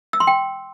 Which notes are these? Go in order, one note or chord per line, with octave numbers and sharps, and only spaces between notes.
E6
C6
G5